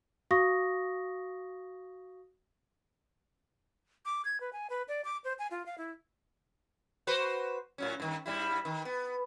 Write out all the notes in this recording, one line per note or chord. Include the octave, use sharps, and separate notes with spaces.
F#4 F5 C#6 D#6 A#6
D6
G#6
B4
G#5
B4
D5
D6
C5
G#5
F4
F5
E4
F#4 B4 C5
A2 F#3 C#4
G2 D#3
G2 G3 E4
D#3
B3